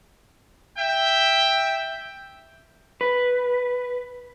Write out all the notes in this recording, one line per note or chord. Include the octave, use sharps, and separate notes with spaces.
E5 G5
B4